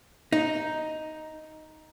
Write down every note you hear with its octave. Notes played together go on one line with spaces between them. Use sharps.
D#4